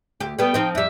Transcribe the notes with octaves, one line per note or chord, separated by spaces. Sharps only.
D2 G4
G3 A3 B3 G5
F3 C4 D#4
F2 G3 E5